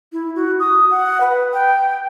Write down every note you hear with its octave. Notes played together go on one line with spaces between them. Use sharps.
E4
F#4
D#6
F#5
B4
G5